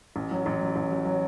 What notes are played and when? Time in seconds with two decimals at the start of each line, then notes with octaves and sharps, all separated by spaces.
0.16 A1
0.31 F#3
0.46 A1
0.61 F#3
0.76 A1
0.91 F#3
1.05 F#3